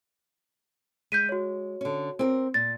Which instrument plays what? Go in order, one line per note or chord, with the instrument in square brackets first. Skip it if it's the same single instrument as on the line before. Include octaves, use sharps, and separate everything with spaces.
[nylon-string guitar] G#3 [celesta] G6 B6 D#7
[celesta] F#4 C#5
[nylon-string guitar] D3 C#4
C4 G#4 A#4
[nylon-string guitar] A#2 [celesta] A6